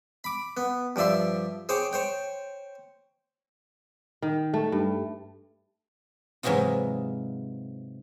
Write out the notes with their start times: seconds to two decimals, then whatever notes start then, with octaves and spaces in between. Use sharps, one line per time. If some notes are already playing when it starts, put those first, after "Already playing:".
0.24 B5 D6
0.57 B3
0.96 G2 F3 D5 E5 C6
1.69 G#4 C5 C#5 G5 D6
1.93 C5 C#5 G5
4.22 D#3
4.54 A3
4.72 G2
6.43 G#2 C3 E3 F#3 D#4 F4